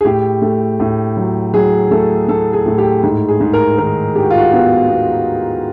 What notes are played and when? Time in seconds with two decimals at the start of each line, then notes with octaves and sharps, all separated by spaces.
0.01 G#4
0.05 A2 G4
0.42 A3
0.80 A2
1.17 F#3
1.54 F#3 G#4
1.91 A3 A4
2.28 A3 A4
2.53 G#4
2.66 A2
2.78 G4
3.03 G#2
3.28 G#4
3.41 G#2
3.53 A#4
3.78 D#3 A#4
4.15 G#3 G4
4.23 F#4
4.30 F4
4.38 F#4
4.53 B3 F#4
4.90 B3